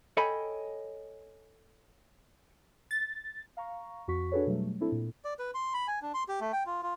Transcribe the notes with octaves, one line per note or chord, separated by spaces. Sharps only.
A4 C#5 D#5 G5 G#5 B5
A6
F5 A#5 C#6
F2 F#4 C#6 B6
D4 F#4 G#4 A4 B4 C#5
B2 F#3 G3 A3
C4 D4 E4 A4
A#2
D5
B4
C6
B5
G#5
D4
C6
G4
A3
G5
F4
F4